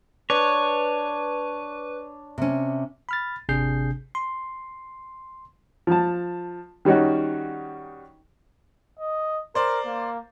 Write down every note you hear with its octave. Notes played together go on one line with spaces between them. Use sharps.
D4 B4 C#5
C3 C#4
B5 F6 A6
G#1 C3 D4 G#4 G6 C7
C6
F3 A5
D#3 G3 C#4 D#4 F#4
D#5
A#4 C5 D5
A#3